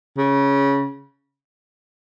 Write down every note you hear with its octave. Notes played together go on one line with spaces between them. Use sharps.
C#3